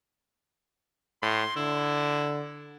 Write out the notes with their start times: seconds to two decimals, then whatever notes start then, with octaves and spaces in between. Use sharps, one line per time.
1.22 A2 C6
1.56 D3 E4